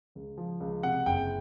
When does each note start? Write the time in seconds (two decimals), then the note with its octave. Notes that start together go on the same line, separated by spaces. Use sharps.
0.15 C#2
0.38 F3
0.60 C#2
0.83 C3 F#5
1.06 F#1 G5